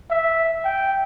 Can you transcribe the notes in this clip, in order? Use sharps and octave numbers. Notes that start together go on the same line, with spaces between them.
E5
G5